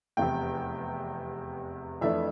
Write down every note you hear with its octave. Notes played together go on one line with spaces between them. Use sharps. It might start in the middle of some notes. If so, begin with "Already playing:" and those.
F1 E2 C3 G5
F2 E3 A3 D4 E5